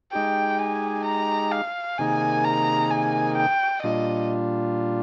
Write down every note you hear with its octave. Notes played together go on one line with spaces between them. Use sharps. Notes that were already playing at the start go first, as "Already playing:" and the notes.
G#3 D#4 G4 G5
G#5
A#5
F5
C3 D#3 A#3 D#4 G#4 G#5
A#5
G#5
G5
A#2 G3 D4 F4 D#5